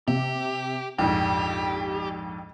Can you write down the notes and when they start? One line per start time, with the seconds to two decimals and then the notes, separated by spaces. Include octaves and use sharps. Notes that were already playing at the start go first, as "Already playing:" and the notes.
0.08 C3 G4
0.99 A#1 F2 G#2 G4 G5